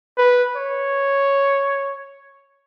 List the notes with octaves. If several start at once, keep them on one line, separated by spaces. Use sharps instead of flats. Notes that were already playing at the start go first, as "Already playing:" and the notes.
B4
C#5